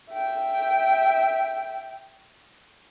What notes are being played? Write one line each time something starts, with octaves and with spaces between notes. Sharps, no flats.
E5 G5